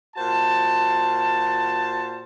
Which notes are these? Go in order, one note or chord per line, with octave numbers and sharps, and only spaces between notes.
A#2 F#4 C5 A5